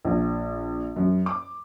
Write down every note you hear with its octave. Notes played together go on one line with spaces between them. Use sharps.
A#1
F#2
D6